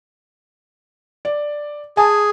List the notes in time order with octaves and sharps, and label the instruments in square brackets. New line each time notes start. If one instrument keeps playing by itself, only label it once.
[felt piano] D5
[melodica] G#4 [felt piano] G#5 A5